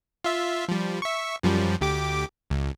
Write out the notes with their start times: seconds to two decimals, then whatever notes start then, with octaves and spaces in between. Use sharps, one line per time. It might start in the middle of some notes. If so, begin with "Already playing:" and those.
0.24 F4 E5
0.68 F3 G3
1.02 E5 C#6
1.43 F#2 F3 G3
1.81 D2 G4 D6
2.50 C#2